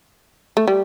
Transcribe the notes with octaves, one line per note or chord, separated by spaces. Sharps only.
A3
G3